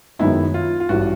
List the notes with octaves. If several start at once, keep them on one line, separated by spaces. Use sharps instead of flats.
F#2 D#3 G#3 B3 D#4 E4
F4
F4
A1 G2 E3 G3 F#4